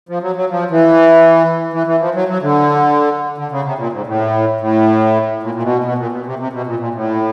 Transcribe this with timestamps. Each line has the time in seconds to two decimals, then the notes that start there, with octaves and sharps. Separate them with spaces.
0.09 F3
0.22 F#3
0.36 F#3
0.50 F3
0.71 E3
1.73 E3
1.87 E3
2.00 F3
2.15 F#3
2.28 F#3
2.42 D3
3.38 D3
3.51 C#3
3.64 C3
3.78 A#2
3.92 G#2
4.07 A2
4.61 A2
5.43 A#2
5.54 A#2
5.63 B2
5.84 B2
5.98 A#2
6.12 B2
6.26 C3
6.39 C3
6.53 B2
6.67 A#2
6.79 A#2
6.94 A2